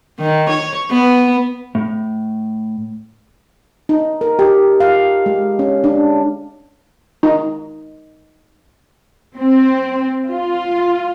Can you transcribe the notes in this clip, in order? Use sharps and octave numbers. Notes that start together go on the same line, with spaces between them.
D#3
C#5
B3
A2
D#4
A#4
G4
F5
G#3
C#4
D4
D#4
C4
F4